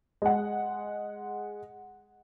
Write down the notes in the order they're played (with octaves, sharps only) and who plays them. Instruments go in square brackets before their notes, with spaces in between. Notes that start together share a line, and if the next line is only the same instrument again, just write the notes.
[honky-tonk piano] G#3 F#5